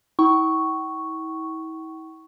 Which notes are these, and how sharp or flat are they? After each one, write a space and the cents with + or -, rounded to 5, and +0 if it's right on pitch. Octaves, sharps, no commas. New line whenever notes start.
E4 -40 G5 -45 C#6 +0